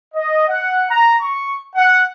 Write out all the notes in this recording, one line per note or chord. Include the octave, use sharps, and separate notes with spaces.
D#5
F#5
A#5
C#6
F#5